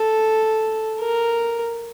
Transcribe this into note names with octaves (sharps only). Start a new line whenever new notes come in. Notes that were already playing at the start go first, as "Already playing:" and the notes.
Already playing: A4
A#4